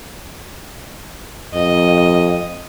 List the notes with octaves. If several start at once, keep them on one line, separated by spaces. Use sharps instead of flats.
F2 D#5